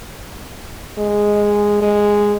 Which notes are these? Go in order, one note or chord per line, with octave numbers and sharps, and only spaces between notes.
G#3
G#3